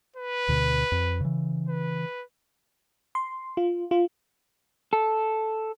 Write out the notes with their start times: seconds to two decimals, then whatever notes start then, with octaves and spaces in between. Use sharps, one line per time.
0.16 B4
0.48 D2 B2 D3
0.92 F2
1.21 C#3 E3
1.68 B4
3.15 C6
3.57 F4
3.91 F4
4.93 A4